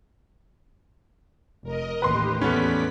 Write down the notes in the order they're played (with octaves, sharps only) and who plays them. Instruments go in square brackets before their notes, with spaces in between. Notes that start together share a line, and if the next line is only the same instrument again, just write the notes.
[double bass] F1 [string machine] A#4 D#5
[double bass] A1 [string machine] D#2 G4 [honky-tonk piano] B4 C6
[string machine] E2 D5 B6 [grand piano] A3 B3 C#4